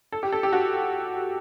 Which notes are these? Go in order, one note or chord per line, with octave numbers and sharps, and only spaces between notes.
A4
G4
A4
G4
F#4